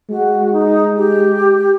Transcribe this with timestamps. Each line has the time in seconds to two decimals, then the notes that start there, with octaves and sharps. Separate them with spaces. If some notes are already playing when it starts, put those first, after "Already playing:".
0.10 G#3 F#4
0.53 D#4
0.97 G4